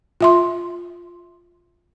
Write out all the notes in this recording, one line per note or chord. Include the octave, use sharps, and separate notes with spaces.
F4 E5 C6